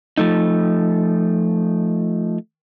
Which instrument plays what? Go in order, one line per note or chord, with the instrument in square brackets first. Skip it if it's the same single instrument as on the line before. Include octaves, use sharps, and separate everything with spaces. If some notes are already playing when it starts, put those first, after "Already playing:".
[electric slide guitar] F3 A3 D#4